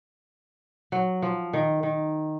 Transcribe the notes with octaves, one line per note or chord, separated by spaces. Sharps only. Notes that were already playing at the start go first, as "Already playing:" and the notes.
F#3
F3
D#3
D#3